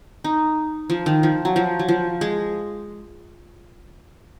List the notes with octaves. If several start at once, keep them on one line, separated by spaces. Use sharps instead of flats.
D#4
F3
D#3
F3
F#3
F3
F#3
F3
G#3